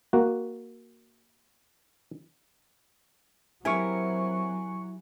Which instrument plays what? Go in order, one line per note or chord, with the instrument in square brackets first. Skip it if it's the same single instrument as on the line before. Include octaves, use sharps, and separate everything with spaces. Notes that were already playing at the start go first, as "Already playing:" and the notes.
[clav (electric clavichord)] A#3 F#4
[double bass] F#3 [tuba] C4 [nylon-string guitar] E4 G4 A#4 [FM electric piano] G#5 C#6